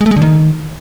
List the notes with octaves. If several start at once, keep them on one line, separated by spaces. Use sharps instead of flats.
G#3
A3
G#3
D3
D#3